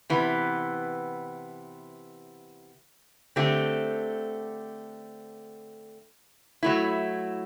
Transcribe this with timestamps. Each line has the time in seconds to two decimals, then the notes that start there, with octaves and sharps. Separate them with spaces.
0.10 C3 E3 B3
3.36 D3 A3 C4 G4
6.63 F#3 A3 E4